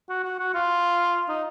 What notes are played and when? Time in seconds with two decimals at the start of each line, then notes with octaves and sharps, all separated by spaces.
0.09 F#4
0.24 F#4
0.39 F#4
0.54 F4
1.29 D#4